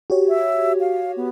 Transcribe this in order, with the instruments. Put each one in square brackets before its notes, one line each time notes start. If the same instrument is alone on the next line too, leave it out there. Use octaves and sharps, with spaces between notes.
[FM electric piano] F#4 G4 C#5
[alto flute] E5
F5
B3